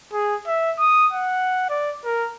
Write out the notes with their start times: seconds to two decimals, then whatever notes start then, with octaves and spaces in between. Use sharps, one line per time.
0.13 G#4
0.47 E5
0.79 D#6
1.13 F#5
1.70 D5
2.05 A#4